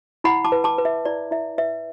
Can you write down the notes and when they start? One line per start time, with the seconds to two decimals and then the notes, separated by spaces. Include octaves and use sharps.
0.24 E4 F#5 B5
0.44 A5 D6
0.52 B4
0.64 A5 D6
0.78 B4
0.85 E5
1.05 E4 D5
1.31 E4 E5
1.58 B4 E5